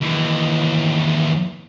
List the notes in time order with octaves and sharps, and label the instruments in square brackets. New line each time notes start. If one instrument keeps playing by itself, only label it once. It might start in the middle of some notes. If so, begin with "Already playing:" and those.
[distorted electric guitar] D#2 E3